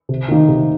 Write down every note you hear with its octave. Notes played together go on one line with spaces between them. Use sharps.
C3
D#3 A#3 D#4
C3